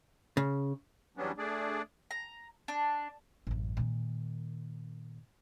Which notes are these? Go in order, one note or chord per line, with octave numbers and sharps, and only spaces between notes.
C#3
E2 F#3 G3 B3 C#4 D4
A3 D4 G#4 D5
A#5
D4
A1 F#2
A#2 D#3